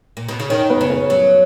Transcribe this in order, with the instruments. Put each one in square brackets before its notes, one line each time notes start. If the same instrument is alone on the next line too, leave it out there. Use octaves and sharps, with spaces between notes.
[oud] A#2
B2
C#3
[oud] D#3 [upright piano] C#4 C#5
[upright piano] B3 B4
[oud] C#3
[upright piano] C#4 C#5
[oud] F#3